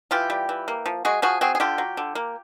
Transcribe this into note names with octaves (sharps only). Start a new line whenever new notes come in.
E3 F4 G4
G3
E3
A#3
F3
G#3 F#4 G#4
F3 F#4 G#4
C4 F#4 G#4
G#4
D3 F4 G4
F#3
D3
A#3